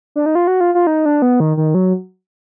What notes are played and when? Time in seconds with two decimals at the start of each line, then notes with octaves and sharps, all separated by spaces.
0.16 D4
0.26 D#4
0.35 F4
0.47 F#4
0.61 F4
0.75 F4
0.87 D#4
1.06 D4
1.22 B3
1.40 D#3
1.57 D#3
1.74 F#3